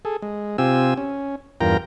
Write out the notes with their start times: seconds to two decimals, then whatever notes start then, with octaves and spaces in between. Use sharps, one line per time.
0.05 G#4 A4
0.22 G#3
0.58 C3 C4 F4 G4 G#5 E6
0.98 C#4
1.61 E2 G2 F4 A#4 G5 A#5